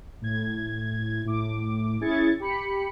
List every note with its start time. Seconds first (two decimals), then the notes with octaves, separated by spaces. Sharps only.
0.21 A2 G#6
1.25 A2 D6
2.01 C#4 E4 G#4 G#6 A6 C#7
2.40 G4 B5 C#7